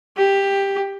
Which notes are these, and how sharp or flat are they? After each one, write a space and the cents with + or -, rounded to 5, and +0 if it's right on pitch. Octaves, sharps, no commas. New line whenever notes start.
G4 +10